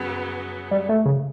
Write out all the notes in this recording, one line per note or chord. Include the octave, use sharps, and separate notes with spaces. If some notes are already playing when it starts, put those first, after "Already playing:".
Already playing: F#2 C#3 F#3 B3
G3
A3
C#3